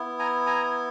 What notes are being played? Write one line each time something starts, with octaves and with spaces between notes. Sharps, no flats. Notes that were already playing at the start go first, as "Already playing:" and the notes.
Already playing: B3 E4
G#5 A#5
G#5 A#5